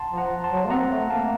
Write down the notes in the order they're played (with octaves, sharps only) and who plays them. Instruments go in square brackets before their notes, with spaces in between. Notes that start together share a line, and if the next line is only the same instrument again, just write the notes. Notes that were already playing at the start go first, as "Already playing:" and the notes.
Already playing: [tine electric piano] F#5 A5 A#5 C6
[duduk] F3
[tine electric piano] F#5 A#5
A5 C6
[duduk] F#3
A#3
[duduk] C4 [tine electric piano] F#5 A#5
[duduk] A3
[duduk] A#3 [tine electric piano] F5 A5